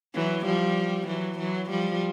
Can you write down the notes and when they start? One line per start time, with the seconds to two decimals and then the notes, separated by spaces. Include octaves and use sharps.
0.14 E3 F#3
0.45 F3 G3
1.08 E3 F#3
1.39 E3 F#3
1.70 F3 G3